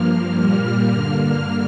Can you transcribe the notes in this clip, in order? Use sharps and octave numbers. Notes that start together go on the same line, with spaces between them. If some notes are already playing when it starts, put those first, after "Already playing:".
Already playing: G2 F3 A#3 F6
A#2 G3 A#3 F6
G2 D3 A#3